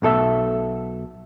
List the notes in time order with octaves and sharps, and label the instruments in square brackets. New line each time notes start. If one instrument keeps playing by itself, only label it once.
[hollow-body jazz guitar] B1 B2 A4 E5